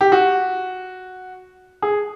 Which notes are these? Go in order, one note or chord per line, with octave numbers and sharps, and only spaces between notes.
G4
F#4
G#4